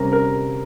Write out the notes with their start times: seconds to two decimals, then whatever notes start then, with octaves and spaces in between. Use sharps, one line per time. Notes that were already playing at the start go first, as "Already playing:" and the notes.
Already playing: C3 G3 C#4 A#4 A#5
0.12 A#4 A#5